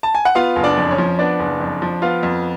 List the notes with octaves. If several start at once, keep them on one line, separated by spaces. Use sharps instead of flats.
A5
G#5
F#5
B3 F4 F5
F#1
D4 D5
F2
C#4 C#5
F3
B3 D4 D5
F#1
F2
F3
B3 F4 F5
F2